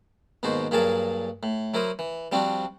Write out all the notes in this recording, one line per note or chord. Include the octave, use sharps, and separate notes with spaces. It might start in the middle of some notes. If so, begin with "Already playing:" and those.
D#2 G#2 B2 F#4 C5
G2 A#2 F#3 G#4 A#4 A5
A2
F#3 E4 A#4 C5 D#6
E3
F3 G3 C4 D4 F#4